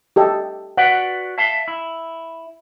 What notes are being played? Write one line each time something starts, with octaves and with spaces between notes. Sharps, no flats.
G4 A4 D#5
F#4 B4 D5 F#5
E5 F5 A5
E4